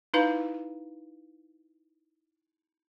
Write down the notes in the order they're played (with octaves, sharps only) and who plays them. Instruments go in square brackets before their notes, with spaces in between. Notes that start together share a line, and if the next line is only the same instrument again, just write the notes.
[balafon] D#4 E4 B4 F5 A#5